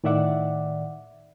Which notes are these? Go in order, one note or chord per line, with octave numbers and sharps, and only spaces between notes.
A2 D#3 D5 E5 F#5 D6